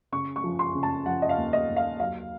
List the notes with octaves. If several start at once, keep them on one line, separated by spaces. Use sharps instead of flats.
C#3 C#6
C#6
F3
C6
C#3
A5
F3 F#5
D#5
F5
D#2
D#5
D#2
F5
F#3 F5